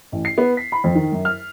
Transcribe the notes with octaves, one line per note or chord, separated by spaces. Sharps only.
A1
C7
B3
B6
B5
F2
D#3
F#2
F6